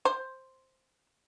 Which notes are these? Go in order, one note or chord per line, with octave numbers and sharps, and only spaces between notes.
C5